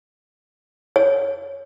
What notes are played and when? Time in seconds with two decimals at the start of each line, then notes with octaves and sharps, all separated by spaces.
0.96 C#5